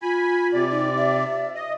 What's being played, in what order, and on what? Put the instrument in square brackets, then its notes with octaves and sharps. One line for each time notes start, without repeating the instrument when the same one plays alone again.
[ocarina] F4 [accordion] G#5 B5
[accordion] C3 D5
[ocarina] D#4
E5
[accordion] D#5